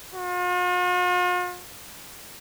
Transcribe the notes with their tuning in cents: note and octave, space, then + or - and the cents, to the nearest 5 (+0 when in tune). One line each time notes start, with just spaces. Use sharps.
F4 +45